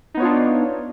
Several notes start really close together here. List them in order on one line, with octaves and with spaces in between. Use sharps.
D#4 B3 C#5 F4 D4